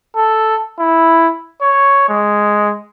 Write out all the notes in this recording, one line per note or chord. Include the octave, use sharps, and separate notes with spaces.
A4
E4
C#5
G#3